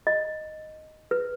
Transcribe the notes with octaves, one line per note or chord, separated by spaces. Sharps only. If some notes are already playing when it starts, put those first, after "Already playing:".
D#5
B4